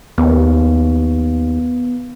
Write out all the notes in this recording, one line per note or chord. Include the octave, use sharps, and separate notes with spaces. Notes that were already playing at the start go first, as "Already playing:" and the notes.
D#2 B3